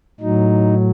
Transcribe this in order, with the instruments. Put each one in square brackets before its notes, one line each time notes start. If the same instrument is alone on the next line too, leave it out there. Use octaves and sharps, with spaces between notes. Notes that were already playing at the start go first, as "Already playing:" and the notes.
[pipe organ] A2 F#3 D#4